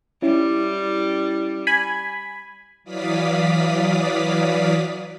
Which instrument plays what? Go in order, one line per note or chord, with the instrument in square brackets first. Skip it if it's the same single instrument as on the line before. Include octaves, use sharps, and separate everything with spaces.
[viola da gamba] G3 [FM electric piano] C#4 E4
[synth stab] G#5 B5
[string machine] E3 F#3 D5 F5 D#6 B6